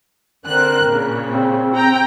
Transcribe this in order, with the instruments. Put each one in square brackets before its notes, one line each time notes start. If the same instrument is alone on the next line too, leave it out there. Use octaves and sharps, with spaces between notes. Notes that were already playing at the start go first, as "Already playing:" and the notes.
[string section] D3 C4 F#6 [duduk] A#4
[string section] A#2 C#3
[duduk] C4
[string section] G5 A#5